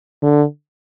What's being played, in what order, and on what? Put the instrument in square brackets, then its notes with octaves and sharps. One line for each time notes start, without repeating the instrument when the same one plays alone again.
[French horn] D3